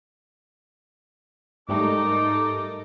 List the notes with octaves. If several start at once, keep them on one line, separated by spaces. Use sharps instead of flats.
G#2 G3 A3 D#4 A4 A#4 D6